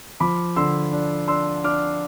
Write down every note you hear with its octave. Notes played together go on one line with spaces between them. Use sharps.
F3 B5 D6
D3 C6 E6
D4
D4 C6 E6
D4 D6 F6